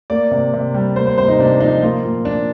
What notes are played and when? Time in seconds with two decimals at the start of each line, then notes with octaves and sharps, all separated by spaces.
0.10 A#3 D5
0.31 C3
0.54 C3
0.74 G3
0.96 A#3 C5
1.07 C5
1.18 C3 C5
1.28 D#4
1.39 C3 D4
1.60 F3 D#4
1.83 A#3 F4
2.04 A#2
2.25 A#2 D4